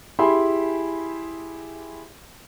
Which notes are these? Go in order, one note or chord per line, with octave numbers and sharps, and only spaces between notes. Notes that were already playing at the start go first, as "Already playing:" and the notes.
E4 G4 G#4 B5 C6